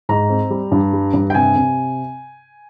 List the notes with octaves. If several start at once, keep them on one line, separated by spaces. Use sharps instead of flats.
G#2 A#5
C4
G3
G2
G3
G2
G5
C3 G#5
C3